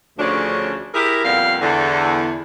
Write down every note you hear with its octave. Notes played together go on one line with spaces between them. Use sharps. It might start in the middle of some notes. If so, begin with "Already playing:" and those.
D2 C#3 F3 C#4 D4
E4 G4 G#4 A#4
F2 A#2 G3 B3 F5
E2 D3